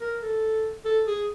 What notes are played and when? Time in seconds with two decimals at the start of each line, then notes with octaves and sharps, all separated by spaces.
0.01 A#4
0.23 A4
0.85 A4
1.07 G#4